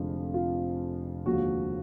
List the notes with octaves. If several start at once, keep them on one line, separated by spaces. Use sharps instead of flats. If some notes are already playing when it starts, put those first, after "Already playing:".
Already playing: F1 F2 D3 F3 G#3
F4
D#2 D3 F3 G#3 F#4